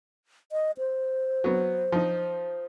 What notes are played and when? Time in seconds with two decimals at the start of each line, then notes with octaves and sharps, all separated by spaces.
0.52 D#5
0.78 C5
1.44 F#3 B3
1.92 F3 D#4